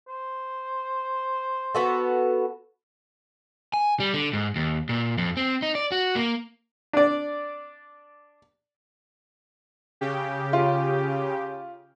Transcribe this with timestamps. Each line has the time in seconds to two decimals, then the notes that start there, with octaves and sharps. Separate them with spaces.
0.08 C5
1.75 B3 F#4 A4
3.74 G#5
4.00 G3
4.14 D3
4.33 G#2
4.56 D#2
4.89 A#2
5.18 F2
5.37 C4
5.62 D#4
5.75 D5
5.92 F#4
6.16 A#3
6.93 D4 D5
10.01 C#3 G4
10.53 F4